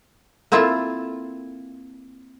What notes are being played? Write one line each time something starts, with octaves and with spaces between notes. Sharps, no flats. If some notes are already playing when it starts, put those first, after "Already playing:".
A#3 C4 E4 F4 A4